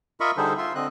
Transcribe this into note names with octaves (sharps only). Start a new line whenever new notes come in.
F4 A#4 D#5 E5 B5 C#6
D3 G3 D#4 G#4 A4 C5
F4 E5 C6
D3 C4 D#5 F#6